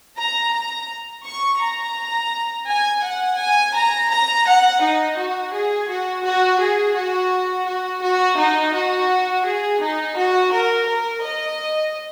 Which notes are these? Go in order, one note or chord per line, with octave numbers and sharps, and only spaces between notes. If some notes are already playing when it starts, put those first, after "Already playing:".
A#5
A#5
C#6
A#5
G#5
F#5
G#5
A#5
A#5
F#5
D#4
F#4
G#4
F#4
F#4
G#4
F#4
F#4
F#4
D#4
F#4
G#4
D#4
F#4
A#4
A#4
D#5